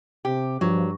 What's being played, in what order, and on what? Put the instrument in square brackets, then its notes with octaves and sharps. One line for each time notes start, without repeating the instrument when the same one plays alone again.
[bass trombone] C3 [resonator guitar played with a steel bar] G4
[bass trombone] G2 [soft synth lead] F3 [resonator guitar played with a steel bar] F#3